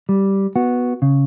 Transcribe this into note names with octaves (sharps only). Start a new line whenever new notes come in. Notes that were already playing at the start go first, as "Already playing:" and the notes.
G3
B3 F#4
C#3